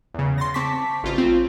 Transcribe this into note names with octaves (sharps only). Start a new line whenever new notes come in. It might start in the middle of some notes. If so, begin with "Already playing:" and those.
E2 C#3
C6 A6 A#6
C4 A5 C#6 D6 B6
A1 C#3 F4 C5
C4 F4